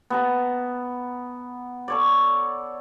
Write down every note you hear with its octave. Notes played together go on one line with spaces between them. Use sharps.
B3 A5 A#5
A4 C#5 D5